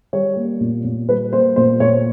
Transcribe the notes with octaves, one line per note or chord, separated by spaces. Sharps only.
G3 C#5
A#3
A#2
A#2
G3 B4
A#3 C5
A#2 C5
A#2 C#5